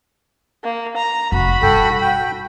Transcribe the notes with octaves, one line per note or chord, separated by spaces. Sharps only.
A#3
A#5
F1 F#4 B5
G2 B2 A4 G5
G5